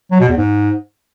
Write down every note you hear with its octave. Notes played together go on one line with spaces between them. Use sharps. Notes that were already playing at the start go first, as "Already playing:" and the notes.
F#3
B2
E2
G#2